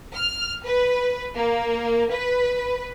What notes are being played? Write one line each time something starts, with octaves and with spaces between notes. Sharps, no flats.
F6
B4
A#3
B4